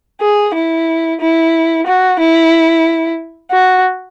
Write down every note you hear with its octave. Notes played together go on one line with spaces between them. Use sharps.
G#4
E4
E4
F#4
E4
F#4